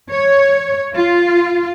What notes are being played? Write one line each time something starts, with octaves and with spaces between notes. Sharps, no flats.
C#5
F4